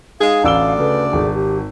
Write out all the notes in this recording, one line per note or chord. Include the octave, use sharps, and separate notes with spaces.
G#3 D#4 G#4 F5
A1 D2 D5 E6 G7
C#3 A3 B4
G#1 G#4
G4